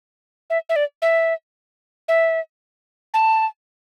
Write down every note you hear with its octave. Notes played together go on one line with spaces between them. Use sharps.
E5
E5
D5
E5
E5
A5